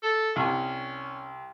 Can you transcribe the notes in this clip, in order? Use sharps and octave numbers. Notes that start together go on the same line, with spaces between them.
A4
C2 C#4